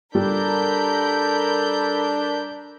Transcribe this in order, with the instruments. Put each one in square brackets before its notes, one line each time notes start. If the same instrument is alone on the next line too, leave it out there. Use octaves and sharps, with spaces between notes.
[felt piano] G3 [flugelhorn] D4 [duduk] A4 [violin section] A#4 B5 G6